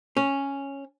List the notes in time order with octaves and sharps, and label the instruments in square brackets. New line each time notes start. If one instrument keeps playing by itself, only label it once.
[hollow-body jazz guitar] C#4